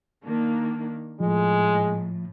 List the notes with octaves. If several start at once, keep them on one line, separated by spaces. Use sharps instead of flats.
D#3 A#3 D4
A2 F3 G#3